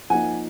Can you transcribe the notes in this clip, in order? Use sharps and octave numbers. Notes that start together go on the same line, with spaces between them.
F3 A#3 D#4 F#5 G#5